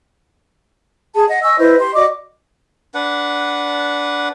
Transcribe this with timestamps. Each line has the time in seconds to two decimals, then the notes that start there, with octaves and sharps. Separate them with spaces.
1.14 G#4 A5
1.28 D#5 F#5
1.43 D#5 G#5 C#6 E6
1.58 E4 B4 C5 D#5
1.78 G4 C6
1.94 F#4 D5 D#5 D6
2.94 D4 B4 F#5